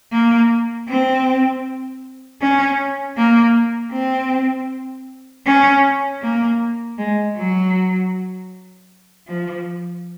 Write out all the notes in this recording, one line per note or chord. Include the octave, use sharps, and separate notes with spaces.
A#3
C4
C#4
A#3
C4
C#4
A#3
G#3
F#3
F3